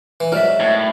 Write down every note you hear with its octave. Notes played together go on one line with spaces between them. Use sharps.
E3
G#2 F#3 A#4 D5 E5
A2